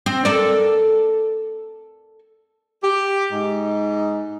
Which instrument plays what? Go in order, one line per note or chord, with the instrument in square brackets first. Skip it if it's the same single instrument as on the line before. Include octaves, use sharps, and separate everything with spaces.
[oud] C4
A4 A#4 D5
[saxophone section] G4
G#2 D#4